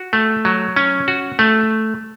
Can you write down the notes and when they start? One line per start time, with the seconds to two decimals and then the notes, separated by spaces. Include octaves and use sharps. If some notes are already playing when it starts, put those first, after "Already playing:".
Already playing: F#4
0.13 A3
0.45 F#3
0.76 C#4
1.08 F#4
1.39 A3